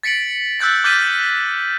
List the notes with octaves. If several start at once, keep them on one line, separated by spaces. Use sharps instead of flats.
A6 B6 C#7 D7 F#7
E6 F#6 G6 A6 B6
D6 F6 G6 A6 B6 D#7